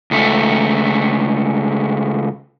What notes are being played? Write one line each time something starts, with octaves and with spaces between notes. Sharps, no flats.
C#2 A3